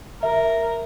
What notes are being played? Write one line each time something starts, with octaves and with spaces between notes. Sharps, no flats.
A#4 E5